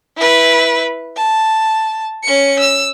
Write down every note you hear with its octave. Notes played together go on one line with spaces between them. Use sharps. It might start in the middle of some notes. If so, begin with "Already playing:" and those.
E4 B4
A5
C#4 C#7
E6